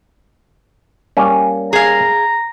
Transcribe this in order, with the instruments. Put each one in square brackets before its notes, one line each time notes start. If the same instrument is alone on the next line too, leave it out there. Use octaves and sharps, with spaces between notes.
[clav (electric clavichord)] G3 A#3 C#4
[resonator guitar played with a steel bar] G#4 F5 [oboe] A#5